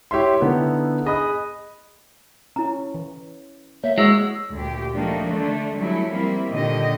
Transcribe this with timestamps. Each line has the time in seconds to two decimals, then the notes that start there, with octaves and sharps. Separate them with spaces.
0.11 E4 G4 C#5 E5 C6
0.40 D3 B3 D#4 E4
1.06 G#4 D#5 B5 D#6 F#6
2.56 C#4 E4 A#5
2.94 E3
3.84 A#3 C#5 E5
3.98 G#3 E4 F#4 C5 C#5 D#5 E6
4.54 D2 A#2 G4
4.96 F3 A3 A#3 D4 D#4
5.26 D3 A3 D4
5.76 F#3 G3 A3 C#4 E4
6.11 F3 G3 A#3 C4 E4
6.52 A#2 D3 D#3 G4 D#5